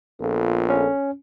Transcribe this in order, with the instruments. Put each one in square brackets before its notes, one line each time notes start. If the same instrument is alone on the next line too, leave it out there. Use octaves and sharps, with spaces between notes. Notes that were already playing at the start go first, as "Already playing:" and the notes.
[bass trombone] A#1 [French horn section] B3 F4 A4
[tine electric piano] C#4